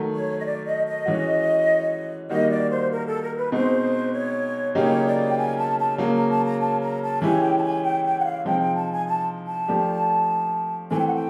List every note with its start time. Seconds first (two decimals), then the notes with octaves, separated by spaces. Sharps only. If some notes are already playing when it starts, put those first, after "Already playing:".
Already playing: D#3 F#3 A3
0.14 C#5
0.37 D#5
0.45 D5
0.66 D#5
0.86 D#5
1.06 E3 G#3 C#4 F#4
2.29 D#3 G3 A#3 D#4 F#4 D#5
2.50 D5
2.70 C5
2.91 A#4
3.07 A4
3.22 A#4
3.37 B4
3.52 B2 G#3 C4 D#4 C5
4.13 C#5
4.75 C#3 F#3 A#3 D#4 G4 C#5
5.07 D5
5.28 G5
5.37 G#5
5.57 A5
5.79 A5
5.98 C#3 F#3 A#3 A#5
6.14 A#5
6.29 A5
6.45 A#5
6.60 A5
6.81 A#5
7.01 A5
7.21 E3 G#3 C#4 E4 G4 G#5
7.42 G5
7.57 A5
7.63 G#5
7.83 G5
8.04 G5
8.19 F#5
8.24 F5
8.45 C3 F3 G#3 C4 D#4 G5
8.61 G5
8.75 A5
8.91 G#5
9.07 A5
9.47 A5
9.68 F3 A3 D4 G4
10.91 E3 A3 C4 G#5
10.99 G5
11.06 F#5
11.14 G5